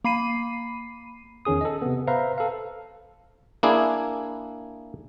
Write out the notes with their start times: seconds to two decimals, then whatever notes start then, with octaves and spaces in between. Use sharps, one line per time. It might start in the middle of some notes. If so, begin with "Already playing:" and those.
0.04 A#3 B5 C7 D#7
1.45 E2 D#3 C#4 G#4 D#6
1.61 A4 D#5
1.82 C3 B3
2.07 B4 C5 E5 F5 A#5
2.38 A4 F5
3.63 A#3 D4 E4 G#4